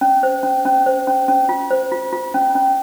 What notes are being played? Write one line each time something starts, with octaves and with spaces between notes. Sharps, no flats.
C#4
C5
C#4
C#4
C5
C#4
C#4
F4
C5
F4
F4
C#4
C#4